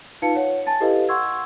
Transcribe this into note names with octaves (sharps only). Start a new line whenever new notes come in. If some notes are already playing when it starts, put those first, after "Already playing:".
D#4 F4 B4 F5 A5 C#7
C#5 F#5
G#5 A5 A6
E4 G4 A4 B4 D#5 F5
F#5 C6 C#6 E6 G#6